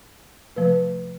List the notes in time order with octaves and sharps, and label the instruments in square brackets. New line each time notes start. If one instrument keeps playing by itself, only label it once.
[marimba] C3 F3 A3 B4